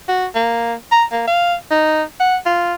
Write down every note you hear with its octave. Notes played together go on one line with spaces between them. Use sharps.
F#4
A#3
A#5
A#3
F5
D#4
F#5
F4